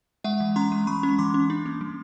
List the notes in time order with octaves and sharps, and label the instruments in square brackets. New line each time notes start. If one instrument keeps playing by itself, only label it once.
[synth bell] G#3 E5 F#5
E3
C#4 A#5 C6
G#3
G#3 B5 C#6
C#4
E3 C6 D6
C#4
D4
A#3
G3